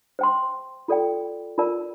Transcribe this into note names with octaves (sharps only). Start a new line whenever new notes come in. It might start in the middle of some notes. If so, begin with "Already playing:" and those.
C5 G5 C6
F4 A4 D5 G5
F4 A#4 D5 A5